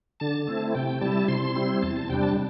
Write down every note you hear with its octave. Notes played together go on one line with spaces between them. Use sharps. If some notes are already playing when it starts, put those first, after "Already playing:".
D3 A5
A3 C4 E4
C3 G5
G3 E4 A5
C3 C6
G3 C4 E4
E2 A5
A5
C3 G3 D4 G5
A5